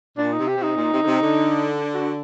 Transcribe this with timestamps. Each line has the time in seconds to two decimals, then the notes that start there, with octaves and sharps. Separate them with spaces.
0.17 A#2 D4
0.32 D#4
0.38 C3
0.48 G4
0.57 C3
0.62 D#4
0.76 A#2
0.92 C3
1.02 D3
1.05 C3
1.21 D3
1.94 F#4